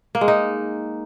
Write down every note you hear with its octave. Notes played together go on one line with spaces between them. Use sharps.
A#3
G#3
D#4